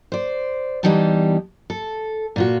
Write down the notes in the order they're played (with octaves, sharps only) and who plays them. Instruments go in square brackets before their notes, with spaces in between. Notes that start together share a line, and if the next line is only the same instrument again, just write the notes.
[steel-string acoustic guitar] C5 D5
E2 E3 G3 D#4 G5 A5
A4
A#2 F4 F#4